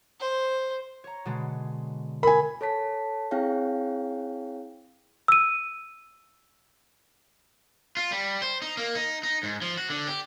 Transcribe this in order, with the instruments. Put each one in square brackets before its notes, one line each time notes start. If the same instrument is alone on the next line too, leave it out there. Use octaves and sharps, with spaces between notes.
[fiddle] C5
[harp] C#5 A#5
B2 D3 G#3
[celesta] A#4 [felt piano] G#5 B5
[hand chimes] A4 C#5 A5 B6
C4 E4 G#4 C#5 F5 G5
[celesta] E6 D#7
[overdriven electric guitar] F4
G3
C5
D#4
A#3
D#4
D#4
G#2
F3
F#4
D3
G4